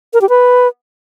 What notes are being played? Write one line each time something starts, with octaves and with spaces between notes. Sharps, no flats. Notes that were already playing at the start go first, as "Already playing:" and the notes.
A#4
G4
B4